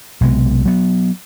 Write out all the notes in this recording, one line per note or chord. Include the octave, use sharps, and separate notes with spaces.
B1 C3 G#3 B3
F#3 B3